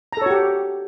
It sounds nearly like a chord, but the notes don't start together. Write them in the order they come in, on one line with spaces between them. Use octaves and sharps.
A#5 A4 C#5 F#4 G4